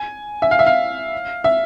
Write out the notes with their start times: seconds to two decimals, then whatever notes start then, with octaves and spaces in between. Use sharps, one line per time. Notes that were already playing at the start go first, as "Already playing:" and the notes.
Already playing: G#5
0.42 E5
0.51 F5
0.59 E5
0.66 F5
1.44 E5